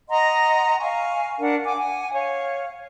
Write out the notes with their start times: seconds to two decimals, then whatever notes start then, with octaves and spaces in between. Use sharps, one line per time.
0.10 D#5 F#5 A#5 C6
0.79 F5 G#5 C#6
1.39 D4 A#4 F#5
1.65 F#5 G#5 D6
1.77 F#5 G#5
2.13 C#5 F5